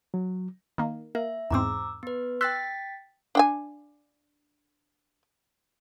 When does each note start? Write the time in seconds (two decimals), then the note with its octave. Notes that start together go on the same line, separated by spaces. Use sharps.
0.14 F#3
0.78 D#3 A#3
1.15 A#3 E5
1.51 E2 G#2 C4 A#5 D6 E6
2.03 B3 B4
2.41 G5 C6 E6 F#6 A6 B6
3.35 D4 G5 G#5